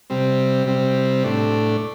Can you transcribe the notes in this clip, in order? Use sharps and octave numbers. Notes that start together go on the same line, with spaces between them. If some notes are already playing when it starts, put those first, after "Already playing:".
C3 G3 C4
C3 G3 C4
A2 A3 D4